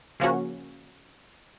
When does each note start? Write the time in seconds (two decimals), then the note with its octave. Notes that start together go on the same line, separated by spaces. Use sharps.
0.20 C#3 F3 A#3 C#4 F#4